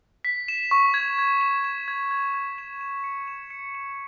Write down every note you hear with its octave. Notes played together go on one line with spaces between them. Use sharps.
B6
E7
C#6
G#6
G#6
E7
E7
G#6
G#6
G#6
E7
E7
C#7
E7
C#7
E7